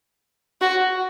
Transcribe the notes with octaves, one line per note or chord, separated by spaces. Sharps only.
F#4